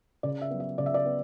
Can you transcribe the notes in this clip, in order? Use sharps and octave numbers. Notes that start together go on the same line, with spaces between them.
C#3 D5
E5
F#3 B3
E5
C#3 D5
E5
D5
B3